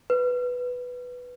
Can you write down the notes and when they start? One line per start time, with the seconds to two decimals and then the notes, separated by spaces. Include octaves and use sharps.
0.10 B4